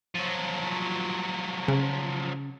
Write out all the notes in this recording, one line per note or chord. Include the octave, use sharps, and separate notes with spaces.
F3 F#3
C#3